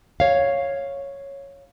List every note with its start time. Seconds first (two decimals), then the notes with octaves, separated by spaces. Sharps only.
0.20 C#5 F5